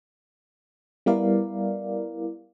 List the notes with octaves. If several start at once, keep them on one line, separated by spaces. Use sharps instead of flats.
G3 B3 E4 A#4 D5 F5